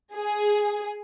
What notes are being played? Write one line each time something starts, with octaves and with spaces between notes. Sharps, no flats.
G#4